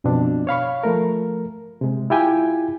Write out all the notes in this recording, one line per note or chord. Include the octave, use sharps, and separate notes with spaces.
F#2 B2 F3 C4 D4
C#5 F5 B5 C#6
F3 A3 A#4
C3 G#3
E4 F4 G4 G5 G#5